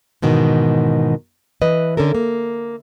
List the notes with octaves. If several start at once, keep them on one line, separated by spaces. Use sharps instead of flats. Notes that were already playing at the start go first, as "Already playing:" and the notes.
G#2 B2 D#3 E3
E3 B4 D#5
D3 C#4 A4 A#4
A#3